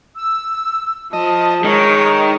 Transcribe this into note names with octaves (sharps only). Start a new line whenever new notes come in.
E6
F3 D#5 A5
D#3 G#3 D#4 A#4 C#5